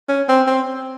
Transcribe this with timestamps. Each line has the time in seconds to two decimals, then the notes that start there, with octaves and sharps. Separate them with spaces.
0.09 C#4
0.29 C4
0.47 C4